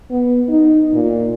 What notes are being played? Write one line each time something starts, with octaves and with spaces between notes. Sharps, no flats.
B3
D#4
A#2